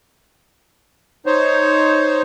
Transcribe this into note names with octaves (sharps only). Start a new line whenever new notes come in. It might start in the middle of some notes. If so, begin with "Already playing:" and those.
D#4 C5 C#5